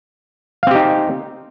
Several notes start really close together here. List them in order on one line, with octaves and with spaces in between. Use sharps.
F5 C4 G4 D#4